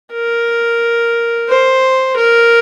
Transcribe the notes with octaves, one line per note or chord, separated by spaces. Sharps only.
A#4
C5
A#4